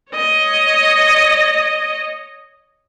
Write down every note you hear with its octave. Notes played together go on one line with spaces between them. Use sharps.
C#5 D#5